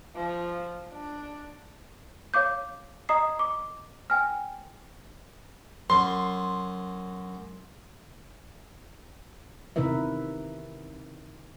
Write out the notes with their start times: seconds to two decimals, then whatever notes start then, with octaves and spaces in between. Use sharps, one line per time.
0.15 F3
0.92 D4
2.34 C#5 F5 D6 G6
3.09 D#5 A#5 D#6 C7
3.39 D6
4.10 G5 G#5 F6
5.90 F#2 C6
9.76 C3 D#3 E4 A#4 B4 E5